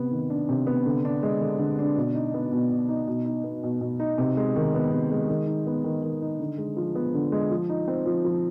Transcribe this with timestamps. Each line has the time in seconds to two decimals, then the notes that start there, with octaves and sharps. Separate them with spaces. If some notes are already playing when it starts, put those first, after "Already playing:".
Already playing: C3 B3
0.11 D#3
0.30 D4
0.49 C3
0.67 B3
0.86 D3
1.05 D4
1.23 G#3
1.41 D3
1.59 D3
1.79 D4
1.96 B2
2.14 D#4
2.34 B3
2.52 B2
2.71 B2
2.89 D#4
3.07 B2
3.25 D#4
3.44 B3
3.63 B2
3.81 B2
3.99 D#4
4.18 C3
4.37 G#3
4.56 D#3
4.74 B3
4.92 C3
5.11 G#3
5.29 D#3
5.47 D#4
5.67 B3
5.84 D#3
6.03 D#3
6.22 D#4
6.40 D3
6.58 G#3
6.77 F3
6.95 B3
7.14 D3
7.32 G#3
7.51 F3
7.69 D#4
7.88 C4
8.06 F3
8.24 F3